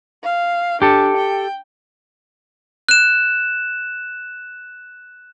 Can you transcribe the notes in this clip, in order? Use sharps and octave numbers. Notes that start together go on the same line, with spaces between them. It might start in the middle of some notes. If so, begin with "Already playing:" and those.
F5
D4 G4 A4
G5
F#6 E7